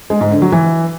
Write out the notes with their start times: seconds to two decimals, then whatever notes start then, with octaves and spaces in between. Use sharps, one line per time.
0.10 G#3
0.21 G#2
0.31 D3
0.42 F#3
0.52 E3